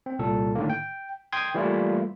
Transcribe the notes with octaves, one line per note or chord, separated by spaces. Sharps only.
C4
C2 A#2 A4
A2 D3 D#3 A#3
G5
G5 C6 D#6 G#6
E3 G3 A3 A#3 E4 F4